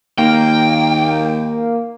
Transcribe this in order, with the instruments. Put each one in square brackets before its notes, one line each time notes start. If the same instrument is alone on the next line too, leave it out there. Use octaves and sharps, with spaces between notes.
[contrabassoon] D#2 [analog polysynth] A#3 [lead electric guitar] G5